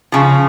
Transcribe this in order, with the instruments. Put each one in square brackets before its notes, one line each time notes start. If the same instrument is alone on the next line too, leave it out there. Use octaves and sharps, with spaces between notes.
[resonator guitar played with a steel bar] C#3 F3